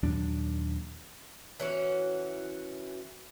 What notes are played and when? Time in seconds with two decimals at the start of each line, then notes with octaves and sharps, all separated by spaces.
0.02 D#2 A#2 F#3 D4
1.60 E3 C#4 F#4